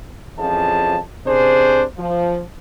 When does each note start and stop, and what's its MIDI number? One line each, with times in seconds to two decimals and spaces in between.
0.38 0.97 41
0.38 0.97 52
0.38 0.97 53
0.38 0.97 61
0.38 0.97 68
0.38 0.97 81
1.26 1.82 48
1.26 1.82 61
1.26 1.82 62
1.26 1.82 68
1.26 1.82 72
1.98 2.41 53